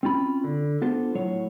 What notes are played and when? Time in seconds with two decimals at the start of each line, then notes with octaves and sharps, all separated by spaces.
0.03 C4 C#4 F4 B5
0.44 D3
0.82 B3 D4 F4 A4 C5
1.15 A2 F#3 C#5